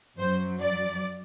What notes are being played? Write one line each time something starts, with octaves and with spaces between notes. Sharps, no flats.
F#2 F#3 C5
D5